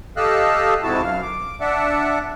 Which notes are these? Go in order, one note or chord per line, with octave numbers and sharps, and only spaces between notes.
G4 A4 D#5 F5 E6 F#6
F2 G#2 C3 E4 F#4 A5
F#2 F5
D6
D4 D5 E5 F#5